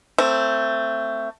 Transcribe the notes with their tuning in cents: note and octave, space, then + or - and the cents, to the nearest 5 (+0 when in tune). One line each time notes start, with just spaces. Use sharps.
A3 +20 C4 +0